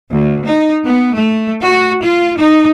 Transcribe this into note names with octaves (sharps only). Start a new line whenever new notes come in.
D2
D#4
B3
A3
F#4
F4
D#4